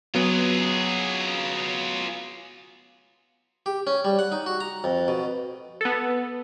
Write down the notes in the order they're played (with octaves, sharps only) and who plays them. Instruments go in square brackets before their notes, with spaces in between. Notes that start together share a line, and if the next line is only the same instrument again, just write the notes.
[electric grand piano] F#3 B3 [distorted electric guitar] F4 G#4
[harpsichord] G4
C#4
G3
F#5
D#4
F#4
A#5
F2
B2
[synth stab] B3 A4